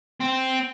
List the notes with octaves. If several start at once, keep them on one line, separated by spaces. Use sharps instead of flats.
C4